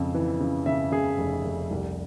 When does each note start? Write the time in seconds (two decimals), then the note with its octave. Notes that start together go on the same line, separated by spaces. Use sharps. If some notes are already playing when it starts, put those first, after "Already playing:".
Already playing: F2 C#3
0.14 E3
0.40 C#3
0.66 C#3 E5
0.91 C#3 G#4
1.18 F1
1.44 F1
1.71 C2